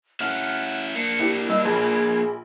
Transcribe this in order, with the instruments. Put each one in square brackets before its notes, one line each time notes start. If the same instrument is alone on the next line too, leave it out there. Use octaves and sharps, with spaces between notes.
[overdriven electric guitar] C#4 E4 [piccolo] F#5 [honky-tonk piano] F6
[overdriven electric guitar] A#3 D4 [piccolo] C#7
[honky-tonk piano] E4 G4
[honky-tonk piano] G2 [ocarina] D#5 [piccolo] E6
[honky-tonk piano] A#1 B5 [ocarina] G#4 [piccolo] G#6